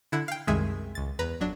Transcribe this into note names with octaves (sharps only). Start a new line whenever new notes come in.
D3 E4 F#5
F5 G5
C2 F#2 D#3 G#3 G#4 E5
C#2 A6
E2 B4 A#5
G1 F#3 D4